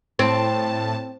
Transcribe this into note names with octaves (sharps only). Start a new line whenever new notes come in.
A2 C4 A5